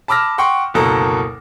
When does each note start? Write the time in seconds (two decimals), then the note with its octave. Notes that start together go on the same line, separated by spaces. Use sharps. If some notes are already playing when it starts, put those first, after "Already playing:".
0.08 A5 B5 D6 E6 F6 A#6
0.38 F#5 G5 C6 C#6
0.74 F#1 D2 B2 A4 A#4 A#5